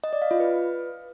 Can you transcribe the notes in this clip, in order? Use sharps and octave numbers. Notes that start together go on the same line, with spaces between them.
D#5
D5
F5
F4
B4